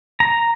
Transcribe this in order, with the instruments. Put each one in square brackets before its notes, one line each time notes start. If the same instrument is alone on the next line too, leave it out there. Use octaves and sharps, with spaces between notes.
[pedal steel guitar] A#5